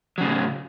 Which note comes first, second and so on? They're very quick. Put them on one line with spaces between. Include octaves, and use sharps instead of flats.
F#3 C#3 A2